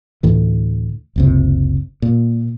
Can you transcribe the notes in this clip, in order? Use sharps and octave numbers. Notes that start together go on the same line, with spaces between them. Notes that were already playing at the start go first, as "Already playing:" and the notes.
D2 A2 E3
F#1 C#2 C3
A#2